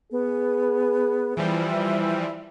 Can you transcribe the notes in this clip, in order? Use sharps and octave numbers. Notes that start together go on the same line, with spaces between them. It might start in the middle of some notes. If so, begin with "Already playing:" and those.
B3 G#4
E3 F3 G3 E5